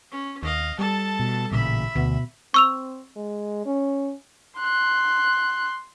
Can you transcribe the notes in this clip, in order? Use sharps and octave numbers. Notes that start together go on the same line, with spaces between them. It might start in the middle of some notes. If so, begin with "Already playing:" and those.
C#4
D#2 D#5 F5
G3 A4 A5
B2
A1 A#2 C#3 E5 B5
D2 B2
C4 C#6 E6 F7
G#3
C#4
C6 F#6